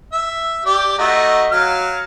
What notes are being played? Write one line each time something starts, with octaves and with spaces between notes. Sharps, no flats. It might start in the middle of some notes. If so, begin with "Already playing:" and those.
E5
G4 D5
A3 D#4 F#4
F#3 F5 F6